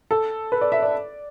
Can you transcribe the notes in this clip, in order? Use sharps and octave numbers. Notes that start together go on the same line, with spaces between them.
A4
B4
D5
E5
D5